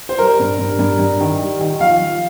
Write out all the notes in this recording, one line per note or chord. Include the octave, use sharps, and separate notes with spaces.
C5
G3 A#4
G2
G2
G2
G2
D#3
G3
D#3
F3 F5
F3